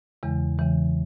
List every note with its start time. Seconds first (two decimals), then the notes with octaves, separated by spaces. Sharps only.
0.23 E2 C#3 E3 G#3
0.58 E2 C#3 E3 G#3